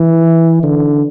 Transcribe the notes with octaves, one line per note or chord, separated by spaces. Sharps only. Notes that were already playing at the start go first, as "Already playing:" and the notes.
Already playing: E3
D3